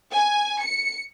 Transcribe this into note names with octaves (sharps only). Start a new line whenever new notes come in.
G#5
C#7